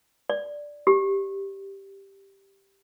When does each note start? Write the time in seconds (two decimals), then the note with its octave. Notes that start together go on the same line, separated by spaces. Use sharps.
0.30 D5
0.87 G4